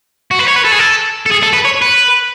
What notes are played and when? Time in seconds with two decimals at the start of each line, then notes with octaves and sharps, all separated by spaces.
0.31 F#4
0.39 B4
0.48 C#5
0.56 B4
0.64 A4
0.72 G#4
0.79 A4
1.26 A4
1.31 G#4
1.43 A4
1.54 B4
1.65 C#5
1.82 B4